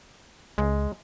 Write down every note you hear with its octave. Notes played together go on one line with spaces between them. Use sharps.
C#2 G#3